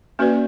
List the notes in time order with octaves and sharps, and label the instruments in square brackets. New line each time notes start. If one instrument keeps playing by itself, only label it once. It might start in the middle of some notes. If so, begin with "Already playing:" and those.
[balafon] A#3 C#4 F#4 B4 D5